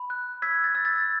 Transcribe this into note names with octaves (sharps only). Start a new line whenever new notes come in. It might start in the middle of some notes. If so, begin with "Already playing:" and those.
Already playing: B5
F#6
E6 G#6 B6
A6
E6
A6